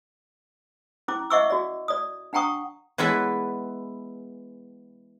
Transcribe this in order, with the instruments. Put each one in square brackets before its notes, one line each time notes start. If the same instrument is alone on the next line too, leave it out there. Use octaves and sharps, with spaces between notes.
[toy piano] C#4 E4 D6
D#5 E5 F#5 C#6 D6 E6
F#4 D5
D5 D#6
D4 F#5 G5 A#5 C#6 D#6
[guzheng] E3 G#3 B3 E4 A4 B4